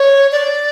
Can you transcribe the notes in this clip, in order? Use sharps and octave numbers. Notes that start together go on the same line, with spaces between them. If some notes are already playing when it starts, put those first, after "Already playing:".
Already playing: C#5
D5